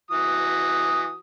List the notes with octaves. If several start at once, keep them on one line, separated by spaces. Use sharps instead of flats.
E3 F#4 D#6